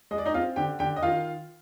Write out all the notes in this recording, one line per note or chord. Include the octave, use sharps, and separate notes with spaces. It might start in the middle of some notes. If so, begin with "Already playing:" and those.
G#3 D#5
D5
D#4 D#5
C4 F4 F5
D3 G4 G5
D3 G4 G5
D#5
D#3 F4 F5